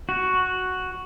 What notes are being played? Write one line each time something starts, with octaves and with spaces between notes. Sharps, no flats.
F#4